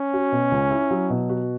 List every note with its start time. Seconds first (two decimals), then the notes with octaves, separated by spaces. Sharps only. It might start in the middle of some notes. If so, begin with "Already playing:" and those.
Already playing: C#4
0.13 F#4
0.32 B2
0.52 C#2
0.71 E4
0.91 F#3
1.10 B2
1.29 F#4